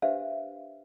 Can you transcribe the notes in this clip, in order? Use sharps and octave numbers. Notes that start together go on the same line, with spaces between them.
D4 G4 B4 C5 E5 F5